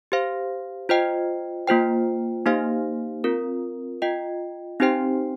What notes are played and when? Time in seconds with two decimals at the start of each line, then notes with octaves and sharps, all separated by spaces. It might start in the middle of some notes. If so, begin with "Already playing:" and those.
0.12 G4 C5 F5
0.89 F4 C5 D#5 G5
1.67 A#3 F4 C5 G5
2.46 A#3 D#4 G4 C5 F5
3.24 C4 F4 A#4
4.02 F4 D#5 G5
4.80 C4 D#4 G4 C5 G5